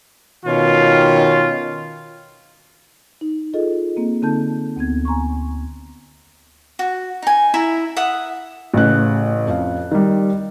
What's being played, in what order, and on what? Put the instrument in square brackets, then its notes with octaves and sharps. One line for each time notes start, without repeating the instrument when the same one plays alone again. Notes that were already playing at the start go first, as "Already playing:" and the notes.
[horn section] B2 D#3 C#4 F4
[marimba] D#4
F4 G#4 A4 D#5
A#3 C4
D3 C4 D#4 A4 A5 G6
D2 B3 C4 G#6
G#5 A#5 C6 C#6
[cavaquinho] F#4
D#4 G#5
E4 E5 A#5
E5 F#5 D#6
[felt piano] A1 C#3 F#6
F2 F5
D#3 G3